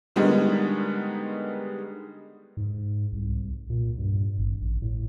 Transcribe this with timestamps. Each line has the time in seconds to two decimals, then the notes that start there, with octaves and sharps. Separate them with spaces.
0.16 D3 D#3 G3 G#3 B3 D#4
2.57 G#2
3.12 C2
3.70 A#2
3.98 G2
4.38 G#1
4.62 A1
4.82 A2